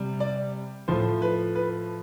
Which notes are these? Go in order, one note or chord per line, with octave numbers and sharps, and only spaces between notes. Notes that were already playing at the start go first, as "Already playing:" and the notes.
Already playing: C3 G3
D5
A2 F3 A3 C5
B4
B4